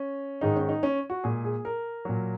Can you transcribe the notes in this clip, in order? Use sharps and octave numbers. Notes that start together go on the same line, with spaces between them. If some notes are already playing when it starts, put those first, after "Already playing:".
Already playing: C#4
G#2 D#3 G#3 D#4
C#4
D#4
C#4
F#4
A#2 G#3 G#4
G#4
A#4
A#2 F#3